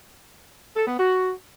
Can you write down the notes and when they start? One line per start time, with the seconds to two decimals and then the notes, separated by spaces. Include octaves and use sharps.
0.76 A4
0.87 B3
0.99 F#4